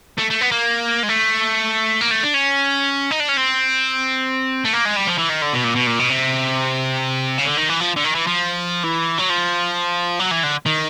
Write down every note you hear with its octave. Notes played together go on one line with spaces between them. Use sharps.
A3
A3
B3
A#3
G#3
A3
A#3
A3
D4
C#4
D#4
D4
C#4
C4
A3
A#3
G#3
G3
F3
E3
D#3
D3
B2
A#2
B2
A#2
B2
C3
C#3
D3
D#3
E3
F3
D3
D#3
E3
F3
E3
F#3
F3
F#3
E3
D3
D#3